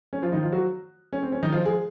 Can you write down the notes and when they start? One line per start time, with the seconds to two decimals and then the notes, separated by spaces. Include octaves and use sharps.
0.13 C#4
0.22 F3 F4
0.32 D#3 D#4
0.43 F3 F4
0.52 F#3 F#4
1.13 C#4
1.23 C4
1.32 C#4
1.43 D#3 D#4
1.52 F3 F4
1.66 G#3 G#4